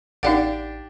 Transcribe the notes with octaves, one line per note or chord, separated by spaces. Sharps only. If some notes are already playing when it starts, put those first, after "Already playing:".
A1 D4 D#4 G4 D5 F5 F#5